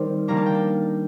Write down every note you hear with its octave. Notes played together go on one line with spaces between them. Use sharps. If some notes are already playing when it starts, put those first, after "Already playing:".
Already playing: D#3 G3 C4 C5
D#3 G3 A#3 D4 A#5
A5
G5
A5